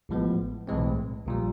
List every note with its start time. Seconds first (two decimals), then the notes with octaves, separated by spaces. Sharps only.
0.09 A1 A2 F3 G#3 B3
0.67 B1 A2 E3 G#3 C4
1.26 A#1 A#2 G3